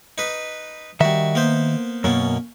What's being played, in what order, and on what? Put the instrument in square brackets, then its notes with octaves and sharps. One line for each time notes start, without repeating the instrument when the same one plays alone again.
[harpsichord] D#4 B4
[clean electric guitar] D#3 E5 [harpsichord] G3 F#4
[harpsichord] A#3 B3 C5
[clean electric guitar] F#2 B2 [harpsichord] A#3 C#4